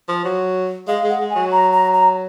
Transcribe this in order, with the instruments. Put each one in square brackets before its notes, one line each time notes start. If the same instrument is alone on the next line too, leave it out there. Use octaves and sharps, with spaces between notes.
[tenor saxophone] F3
F#3
[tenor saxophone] G#3 [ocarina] F5
[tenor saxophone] G#3
[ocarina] F#5
[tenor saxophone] G#3
[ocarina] G#5
[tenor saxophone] F#3
[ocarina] A#5
A#5
A#5